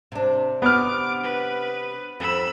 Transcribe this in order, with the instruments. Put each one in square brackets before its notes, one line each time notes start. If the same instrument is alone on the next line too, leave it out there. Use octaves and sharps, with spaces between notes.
[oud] C3 D4
[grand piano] B3 F6 [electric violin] D6
[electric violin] B4
[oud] F2 [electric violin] B5 E6